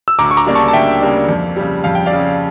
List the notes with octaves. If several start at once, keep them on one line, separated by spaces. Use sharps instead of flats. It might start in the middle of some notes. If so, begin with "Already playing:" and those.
E6
D2 A#5 D6
C#6
A#5 D6
C#3 G3 A#3 D4
A5 C#6
A5
D2 E5 G5
C#3 G3 A#3 D4
F2
C#3 G3
F2 F5
G5
D5 F5
C#3 G3